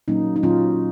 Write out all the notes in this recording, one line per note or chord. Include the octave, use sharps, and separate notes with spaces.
A#2 F#3 A#3 C#4 D#4
D#4
A#2 F#3 A#3 C#4 F4